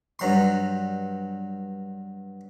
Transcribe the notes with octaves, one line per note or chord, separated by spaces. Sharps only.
G2 F#3 C6